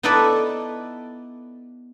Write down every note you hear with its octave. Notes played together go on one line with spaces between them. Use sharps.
B3 D#4 E4 A4 B4 D5